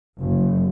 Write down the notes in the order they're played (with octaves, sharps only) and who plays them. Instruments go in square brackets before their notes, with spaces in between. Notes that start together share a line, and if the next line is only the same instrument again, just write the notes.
[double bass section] F#1